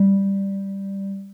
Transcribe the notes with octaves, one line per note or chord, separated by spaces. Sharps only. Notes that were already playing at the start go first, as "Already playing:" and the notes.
Already playing: G3